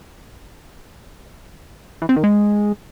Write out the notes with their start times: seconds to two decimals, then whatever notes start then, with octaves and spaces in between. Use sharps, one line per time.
2.02 E3
2.09 C4
2.16 D#3
2.24 G#3